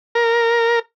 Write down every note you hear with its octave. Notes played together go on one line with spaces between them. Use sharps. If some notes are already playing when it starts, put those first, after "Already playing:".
A#4